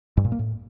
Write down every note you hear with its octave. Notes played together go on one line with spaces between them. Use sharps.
G2
A#2
A#3
A2